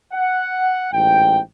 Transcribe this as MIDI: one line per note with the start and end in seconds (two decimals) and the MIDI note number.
0.12 0.87 78
0.92 1.39 33
0.92 1.39 44
0.92 1.39 79